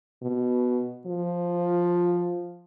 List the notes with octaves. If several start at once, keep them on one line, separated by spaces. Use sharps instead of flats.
B2
F3